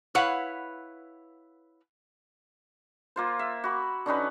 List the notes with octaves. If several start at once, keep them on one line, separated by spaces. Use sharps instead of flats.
E4 B4 C#5 F5 F#5
A#3 F4 C5
E5
F#4 B5
D3 C#4 D#4 B4